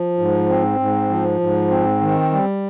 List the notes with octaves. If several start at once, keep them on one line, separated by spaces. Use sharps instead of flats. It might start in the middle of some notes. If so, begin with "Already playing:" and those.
Already playing: F3
G#2
C4
G#2
F3
G#2
C4
D#3
G3